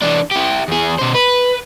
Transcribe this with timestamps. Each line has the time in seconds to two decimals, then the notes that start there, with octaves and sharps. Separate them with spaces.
0.02 E3 D4
0.31 E4 G4
0.68 E2 G#4
0.99 B2 C5
1.15 B4